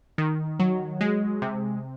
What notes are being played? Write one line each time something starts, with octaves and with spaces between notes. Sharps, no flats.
D#3
F#3
G#3
C3